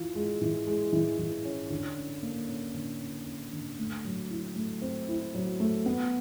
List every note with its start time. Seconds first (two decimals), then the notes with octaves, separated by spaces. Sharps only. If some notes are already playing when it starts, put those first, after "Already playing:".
Already playing: E3 F4
0.15 G#3
0.41 E3
0.67 G#3
0.93 E3
1.19 E3
1.45 C#4
1.70 D3
1.97 C#4
2.23 A#3
2.48 C#4
2.74 D3
3.01 C#4
3.27 C#4
3.53 D3
3.79 A3
4.05 F#3
4.30 E4
4.56 A3
4.82 C4
5.08 E4
5.35 F#3
5.60 A3
5.86 B3